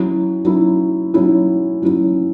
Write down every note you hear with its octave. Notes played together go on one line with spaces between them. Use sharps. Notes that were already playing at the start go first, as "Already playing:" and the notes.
Already playing: F#3 C#4 E4
F#3 C#4 E4
F#3 C#4 E4
F#3 C#4 E4